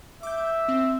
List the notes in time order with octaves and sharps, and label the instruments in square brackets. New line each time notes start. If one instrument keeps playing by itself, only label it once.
[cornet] E5 [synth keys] D6 G6
[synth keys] C4